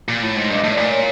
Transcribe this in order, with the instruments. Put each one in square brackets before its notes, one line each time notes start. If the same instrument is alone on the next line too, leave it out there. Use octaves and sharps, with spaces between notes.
[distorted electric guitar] A#2
A2
G#2
[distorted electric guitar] G2 [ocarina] D#5
[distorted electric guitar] A2
[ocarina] D5
[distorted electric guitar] A#2
[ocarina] C#5